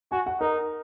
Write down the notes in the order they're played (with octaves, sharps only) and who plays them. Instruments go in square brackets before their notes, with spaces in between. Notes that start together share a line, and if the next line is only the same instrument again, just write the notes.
[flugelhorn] F#4 [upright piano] G#5
[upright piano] F#5
[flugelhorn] D#4 [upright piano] A#4